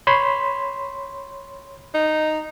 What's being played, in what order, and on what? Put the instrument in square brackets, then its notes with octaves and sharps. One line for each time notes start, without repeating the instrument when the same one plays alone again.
[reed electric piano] C#5 B5 C6
[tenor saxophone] D#4